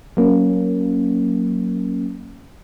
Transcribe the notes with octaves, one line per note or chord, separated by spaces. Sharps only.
F#3 A#3 C#4